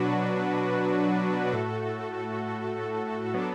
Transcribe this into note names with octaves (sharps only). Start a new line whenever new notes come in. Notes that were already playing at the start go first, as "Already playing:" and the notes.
Already playing: B2 F#3 D4 F#4 B4
A2 A3 F#4 A4
F#3 B3 D4 A4